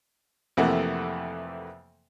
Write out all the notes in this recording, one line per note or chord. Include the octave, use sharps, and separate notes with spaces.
F2 C3 E3 A3 A#3 F#5